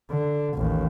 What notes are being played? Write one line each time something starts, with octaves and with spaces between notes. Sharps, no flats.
D3
A1 D#2